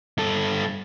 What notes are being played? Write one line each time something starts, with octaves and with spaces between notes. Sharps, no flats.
G2 A4